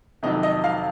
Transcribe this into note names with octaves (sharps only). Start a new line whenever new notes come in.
F2 C3 D#3 F#3 D#5
D#5
F5